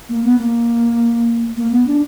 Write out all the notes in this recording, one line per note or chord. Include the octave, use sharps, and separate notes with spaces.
A#3
B3
A#3
A#3
B3
D4